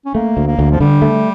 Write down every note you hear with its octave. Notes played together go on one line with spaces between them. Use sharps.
C#4
A3 A#3
D2
A#3
D2
F3
D3 G3
A3